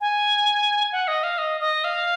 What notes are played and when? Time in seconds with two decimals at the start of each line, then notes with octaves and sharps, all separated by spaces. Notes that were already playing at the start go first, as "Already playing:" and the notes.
0.01 G#5
0.92 F#5
1.08 D#5
1.23 F5
1.38 D#5
1.61 D#5
1.84 F5